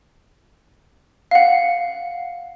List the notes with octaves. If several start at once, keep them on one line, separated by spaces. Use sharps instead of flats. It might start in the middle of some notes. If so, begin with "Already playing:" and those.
F5 F#5